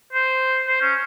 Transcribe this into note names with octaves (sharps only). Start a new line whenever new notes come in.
C5
C5
C#4